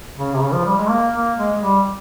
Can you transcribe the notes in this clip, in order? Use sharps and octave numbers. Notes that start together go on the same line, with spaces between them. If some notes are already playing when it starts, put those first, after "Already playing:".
C#3
C3
C#3
F3
G3
G#3
A#3
A#3
G#3
G3